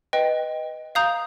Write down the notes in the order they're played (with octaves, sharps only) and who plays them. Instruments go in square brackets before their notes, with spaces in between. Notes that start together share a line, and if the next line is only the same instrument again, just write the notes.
[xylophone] B4 D#5 G5
F5 A#5 D#6 G6